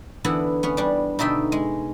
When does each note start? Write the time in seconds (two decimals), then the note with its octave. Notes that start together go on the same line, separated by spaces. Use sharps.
0.24 D3 E3 B3 D4 E4
0.63 B3 C#4 B4
0.77 G3 D4
1.19 B2 D3 D#4 A4 E5 G5
1.52 G#3